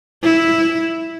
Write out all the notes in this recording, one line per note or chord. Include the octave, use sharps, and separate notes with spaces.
E4